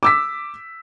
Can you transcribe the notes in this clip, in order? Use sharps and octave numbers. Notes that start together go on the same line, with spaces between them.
D6 E6 B6